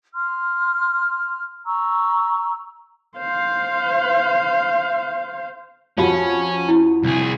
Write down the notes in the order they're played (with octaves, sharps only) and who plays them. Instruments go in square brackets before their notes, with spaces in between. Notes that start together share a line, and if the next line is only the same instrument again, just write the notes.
[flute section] C6 F6
A#5 C#6 E6
[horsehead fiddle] C5 F5
[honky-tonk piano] F2 F#4 B5 [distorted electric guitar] C#4 [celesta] G4
[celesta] E4
[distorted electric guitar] C2 G#4